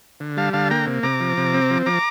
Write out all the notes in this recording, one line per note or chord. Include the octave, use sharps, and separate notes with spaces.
D3
G3 F5 A5
D3 F5 A5
A#3 G5 A#5
C3
C3 A#5 D6
F3
C3
C4
F3
F3 A#5 D6